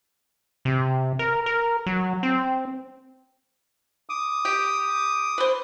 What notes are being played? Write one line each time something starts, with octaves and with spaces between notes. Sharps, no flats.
C3
A#4
A#4
F#3
C4
D6 D#6
G4
B4 C5